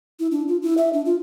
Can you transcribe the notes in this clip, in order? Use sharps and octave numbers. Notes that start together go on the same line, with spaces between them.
E4
D4
F4
E4
E5
D4
F4